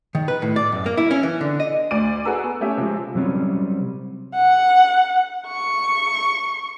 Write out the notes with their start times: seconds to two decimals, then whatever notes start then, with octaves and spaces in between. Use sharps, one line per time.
0.15 D#3
0.28 B4
0.42 A2
0.56 D5
0.72 F#2
0.86 A#3
0.97 E4
1.11 C#4
1.23 E3
1.41 D3
1.60 D#5
1.91 D2 D5 D7 D#7
2.25 F#4 G#4 A4 B4 A#5 E6
2.43 B3
2.61 A3 C#4 G4 E5
2.77 C3 F3 G#3
3.15 C3 F#3 G3 C4 C#4
4.35 F#5
5.48 C#6